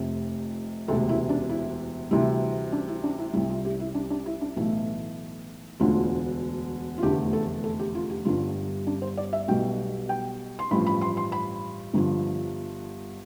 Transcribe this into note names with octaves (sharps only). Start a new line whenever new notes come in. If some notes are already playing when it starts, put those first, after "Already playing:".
Already playing: F1 F2 C3
E1 D2 C3 A4
E4
D4
E4
D2 C3 E3 G3 E4
D4
E4
D4
E4
C2 C3 G3 E4
F4
G4
E4
D4
D4
E4
D4
B1 A2 E3 A3 E4
E1 D2 D3 F4
F4
F1 E2 D3 A3 G4
A4
A4
G4
F4
G4
G1 G2 D3 G3 F4
D4
C5
D5
E5
B1 B2 G3 G5
G5
C6
A1 G2 F3 B5
B5
C6
C6
B5
G1 G2 D3 F3